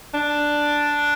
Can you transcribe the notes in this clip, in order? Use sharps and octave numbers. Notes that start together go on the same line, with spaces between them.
D4